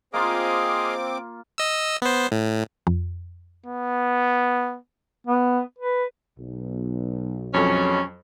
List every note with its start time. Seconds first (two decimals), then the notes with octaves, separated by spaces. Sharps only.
0.14 A#3 C4 F4 G#4 D#5 F5 D6
1.58 D#5 E6
2.02 B3 C5
2.32 A2
2.87 F2
3.66 B3
5.27 B3
5.79 B4
6.38 B1
7.54 F2 B2 F#3 G#3 C#4 A4